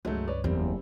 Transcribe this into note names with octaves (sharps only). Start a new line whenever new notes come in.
C#2 G2 F#3 G#3 A3
B4 C#5 D5
F#1 E2 G3 A#3 C4